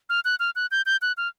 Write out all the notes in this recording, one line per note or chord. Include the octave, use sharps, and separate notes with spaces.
F6
F#6
F6
F#6
G6
G6
F#6
F6